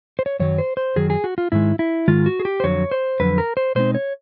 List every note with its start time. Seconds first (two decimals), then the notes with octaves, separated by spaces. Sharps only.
0.19 C5
0.26 C#5
0.40 F#2 D#3 F#3 C#5
0.58 C5
0.77 C5
0.96 F#2 D#3 F#3 G#4
1.10 G#4
1.24 F#4
1.38 F4
1.52 G#2 D#3 G#3 E4
1.79 E4
2.08 G#2 D#3 G#3 F4
2.26 F#4
2.40 G#4
2.45 G4
2.60 C5
2.64 F2 D3 F#3 C#5
2.91 C5
3.20 F2 D3 F#3 B4
3.38 A#4
3.57 C5
3.75 B2 G#3 C4 D#4 C5
3.95 C#5